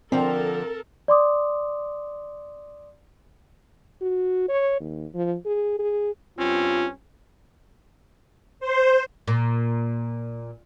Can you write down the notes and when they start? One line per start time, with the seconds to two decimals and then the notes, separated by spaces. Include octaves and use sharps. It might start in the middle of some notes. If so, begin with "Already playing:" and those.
0.12 D3 F3 C4 A4 A#4
1.08 D5 C6 D6 D#6
4.02 F#4
4.49 C#5
4.80 D#2
5.14 F3
5.46 G#4
5.79 G#4
6.39 G2 C4 C#4 F4
8.60 C5
9.28 A#2